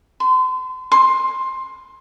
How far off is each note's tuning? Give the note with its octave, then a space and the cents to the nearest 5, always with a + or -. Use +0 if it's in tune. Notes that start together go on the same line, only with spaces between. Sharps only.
C6 -35
C6 +15